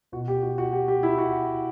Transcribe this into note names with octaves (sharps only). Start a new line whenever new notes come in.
B2 F#4
G4
F#4
F#4
G4
G4
E4
F#4